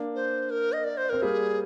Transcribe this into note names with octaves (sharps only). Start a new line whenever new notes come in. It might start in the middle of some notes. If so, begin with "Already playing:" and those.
Already playing: A#3 D4
C5
A#4
D#5
D5
C5
C4 A#4
G3 A#3 G#4